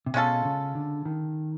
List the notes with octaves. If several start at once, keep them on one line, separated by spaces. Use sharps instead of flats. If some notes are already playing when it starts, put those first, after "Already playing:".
C3
B2 G#3 C#4 F4 A4
C#3
D3
D#3